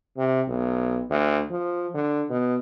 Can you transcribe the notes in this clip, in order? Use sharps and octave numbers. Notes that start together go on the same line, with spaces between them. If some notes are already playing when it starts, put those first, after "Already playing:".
C3
B1
D2
F3
D3
B2